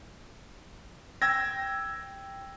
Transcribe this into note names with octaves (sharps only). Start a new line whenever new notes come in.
G5 E6 G#6 A#6